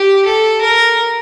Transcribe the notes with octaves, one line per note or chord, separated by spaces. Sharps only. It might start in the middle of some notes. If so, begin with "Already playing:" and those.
Already playing: G4
A4
A#4